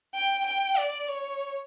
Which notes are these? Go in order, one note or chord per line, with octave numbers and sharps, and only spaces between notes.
G5
G5
D5
C#5